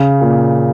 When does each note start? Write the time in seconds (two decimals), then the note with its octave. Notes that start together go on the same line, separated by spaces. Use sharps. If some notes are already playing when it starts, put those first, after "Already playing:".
Already playing: C#3
0.21 A#2